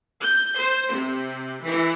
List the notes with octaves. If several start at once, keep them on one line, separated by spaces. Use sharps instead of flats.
G6
C5
C3
E3